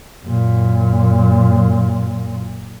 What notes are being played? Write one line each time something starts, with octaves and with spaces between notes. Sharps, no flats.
F#2 A#2